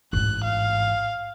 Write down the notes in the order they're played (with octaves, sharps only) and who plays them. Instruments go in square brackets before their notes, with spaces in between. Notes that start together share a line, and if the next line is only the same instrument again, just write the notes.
[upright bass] A1 G#2 [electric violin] F#6
[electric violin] F5